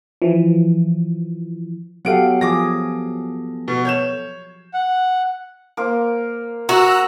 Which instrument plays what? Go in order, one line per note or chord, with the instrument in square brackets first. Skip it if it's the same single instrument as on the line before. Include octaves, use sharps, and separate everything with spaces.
[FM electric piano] E3 F3
[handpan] F#3 G4 F5 [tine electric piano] B3 A4 [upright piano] F#5 D7
[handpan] F3 G#4 [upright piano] D6 A#6
[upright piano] B2
C#5 G6 E7
[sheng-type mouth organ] F#5
[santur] A#3 A#4 C5
[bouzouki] F#4 [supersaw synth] A#5 E6 F#6